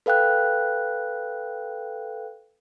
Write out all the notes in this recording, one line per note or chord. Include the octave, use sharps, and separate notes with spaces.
A4 B4 F5 G5 F#6